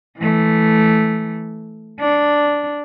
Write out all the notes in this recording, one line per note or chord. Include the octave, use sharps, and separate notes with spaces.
E3 A3
D4